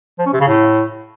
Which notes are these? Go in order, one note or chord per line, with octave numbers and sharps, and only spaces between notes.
F3
C#4
C3
C#3
A2